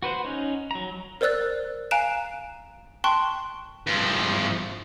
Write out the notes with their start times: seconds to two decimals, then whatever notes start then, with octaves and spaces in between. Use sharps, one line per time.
0.03 F#4 B4 C5 F#5
0.25 C#4 D#4
0.71 F#3 A#5
1.21 A#4 C5 D5 E6 F#6 A6
1.91 F5 G#5 A#5 F#6 D7 E7
3.04 G5 A5 C6 C#6 F#6
3.87 G2 F3